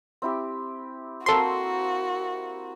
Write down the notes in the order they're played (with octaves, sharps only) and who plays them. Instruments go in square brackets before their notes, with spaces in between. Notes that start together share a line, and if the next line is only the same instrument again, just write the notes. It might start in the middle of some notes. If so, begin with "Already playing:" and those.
[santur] C4 E4 G4
[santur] A#3 C4 C5 [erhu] F#4 [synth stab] A4 C6